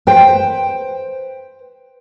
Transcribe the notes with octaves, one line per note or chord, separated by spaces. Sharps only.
B4 C5 G5